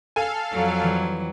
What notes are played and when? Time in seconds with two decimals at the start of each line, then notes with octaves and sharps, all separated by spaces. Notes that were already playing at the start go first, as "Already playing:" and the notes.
0.16 A4 F5 G#5
0.52 F2 F#3
0.83 E3 G3